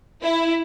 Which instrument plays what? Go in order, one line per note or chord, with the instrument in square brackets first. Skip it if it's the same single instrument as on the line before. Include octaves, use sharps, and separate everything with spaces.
[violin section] E4